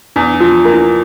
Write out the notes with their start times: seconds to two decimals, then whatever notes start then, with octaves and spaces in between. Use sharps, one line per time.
0.16 E2 D4
0.34 D4
0.40 F3
0.65 A#3
0.72 E4